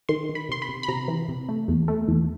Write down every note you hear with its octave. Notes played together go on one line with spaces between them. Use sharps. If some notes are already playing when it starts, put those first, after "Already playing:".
D#3 C6
D#3
B5
C3 C6
B5
C3
B5
C3 A#5
E3
C3
A3
E2
A3
E2